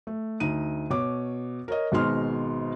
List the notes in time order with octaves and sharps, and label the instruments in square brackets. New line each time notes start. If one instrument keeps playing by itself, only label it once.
[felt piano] A3
D2 D#4 D#7
B2 C#5 D6
A#4 C#5 D#5
G#1 B2 G#3 D#4 C6 F6